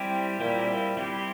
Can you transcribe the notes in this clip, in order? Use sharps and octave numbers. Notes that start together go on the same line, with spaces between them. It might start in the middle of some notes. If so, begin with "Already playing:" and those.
Already playing: G3 C4 E4 G4
A#2 G3 C4 E4 G4
G3 C4 E4 G4